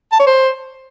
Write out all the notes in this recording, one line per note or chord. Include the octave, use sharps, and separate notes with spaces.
A5
C#5
C5